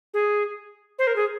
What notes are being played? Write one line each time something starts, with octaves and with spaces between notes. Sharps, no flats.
G#4
C5
A#4
G#4